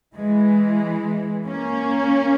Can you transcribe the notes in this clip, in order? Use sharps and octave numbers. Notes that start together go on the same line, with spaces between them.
E3 G#3
A#3 C#4